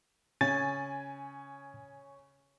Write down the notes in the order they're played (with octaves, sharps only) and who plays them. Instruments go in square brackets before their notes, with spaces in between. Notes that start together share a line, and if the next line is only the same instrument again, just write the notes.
[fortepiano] C#3 [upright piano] C#5 [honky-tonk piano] G#5 [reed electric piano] A6